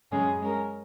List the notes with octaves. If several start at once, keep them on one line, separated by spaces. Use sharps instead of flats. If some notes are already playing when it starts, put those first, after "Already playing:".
F#2 C#3 G#3 C#4 G#4
G#3 C#4 A#4